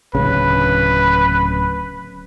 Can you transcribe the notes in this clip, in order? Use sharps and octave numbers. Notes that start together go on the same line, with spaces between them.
D1 A#1 C#3 B4